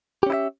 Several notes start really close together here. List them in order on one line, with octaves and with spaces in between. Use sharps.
G4 C#4 E4 E5